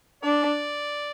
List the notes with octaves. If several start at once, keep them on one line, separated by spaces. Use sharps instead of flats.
D4 D5